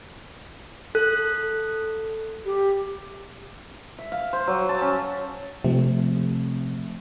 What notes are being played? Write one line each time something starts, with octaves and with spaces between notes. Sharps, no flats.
A4 F#6
G4
E5
F5
C5
F#3
A5
C#4
C3 F3 A3